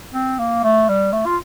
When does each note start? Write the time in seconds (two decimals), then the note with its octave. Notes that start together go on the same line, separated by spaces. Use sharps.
0.14 C4
0.39 A#3
0.63 A3
0.88 G3
1.12 A3
1.26 F4